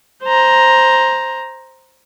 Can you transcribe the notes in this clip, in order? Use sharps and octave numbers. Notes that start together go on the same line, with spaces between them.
C5 A#5